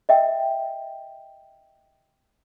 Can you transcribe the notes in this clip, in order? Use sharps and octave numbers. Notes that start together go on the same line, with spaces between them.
D#5 E5 G5